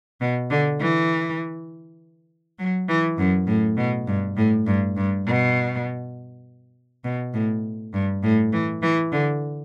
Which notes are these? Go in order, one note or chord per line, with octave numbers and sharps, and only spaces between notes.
B2
D3
E3
F#3
E3
F#2
A2
B2
G2
A2
G2
G2
B2
B2
A2
G2
A2
E3
E3
D3